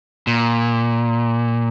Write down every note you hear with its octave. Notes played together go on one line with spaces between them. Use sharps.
A#2